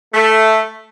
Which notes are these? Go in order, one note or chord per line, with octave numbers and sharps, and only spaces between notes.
A3